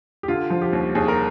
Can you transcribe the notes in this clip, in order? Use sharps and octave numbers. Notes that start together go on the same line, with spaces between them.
G4
D3 F4
F3
G4
D#2
D#2 G#4
A#4